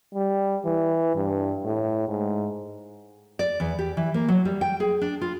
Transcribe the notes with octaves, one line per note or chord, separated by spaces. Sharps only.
G3
E3
G2
A2
G#2
D5
E2
G4
E3
A#3
F#3
G3
G5
G#4
D4
F4